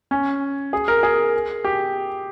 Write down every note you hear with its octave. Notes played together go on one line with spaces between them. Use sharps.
C#4
G#4
A#4
G#4
G4